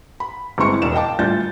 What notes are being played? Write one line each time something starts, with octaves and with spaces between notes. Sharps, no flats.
B5
G1 G#3 C4 E4 C#6 C#7
E1 D4 D5 E7
D#5 F5 G5 A5 D6
D2 G3 F4 D5 G6 A6